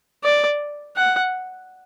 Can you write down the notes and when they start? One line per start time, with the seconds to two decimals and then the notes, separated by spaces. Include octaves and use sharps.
0.24 D5
0.96 F#5